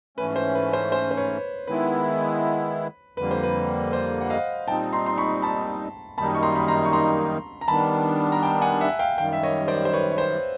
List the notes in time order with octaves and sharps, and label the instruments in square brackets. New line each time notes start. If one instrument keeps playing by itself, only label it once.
[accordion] G#2 E3 A3 C#4 [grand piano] B4
[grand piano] C5
B4
C5
C5
C5
B4 C#5
[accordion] D#3 G#3 B3 E4 [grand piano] B4
[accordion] F2 D3 G3 A#3 [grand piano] B4
[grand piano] C5
B4
C5
F#5
D#5 F5
[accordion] A#2 G3 C4 D#4 [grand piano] G5 A5
[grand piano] A#5 C6
C6
B5 C#6
A5 B5
[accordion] F#2 D#3 G3 A#3 D#4 [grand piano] A5 B5
[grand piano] C#6
A#5 C6
B5
A#5 C6
C#6
A#5 C6
A#5
[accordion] D#3 G3 B3 D4 [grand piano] A5 B5
[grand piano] A#5
G5 A5
F#5 G#5
E5 F#5
F#5
F5 G5
[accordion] F#2 D#3 G3 [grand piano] F5 G5
[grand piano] E5
C#5 D#5
C5 D5
C5
B4 C#5
C#5
C5